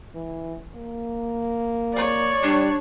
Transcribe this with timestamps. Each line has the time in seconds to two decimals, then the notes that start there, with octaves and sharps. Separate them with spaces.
0.15 E3
0.76 A#3
1.94 C#5 D5
2.43 G3 D4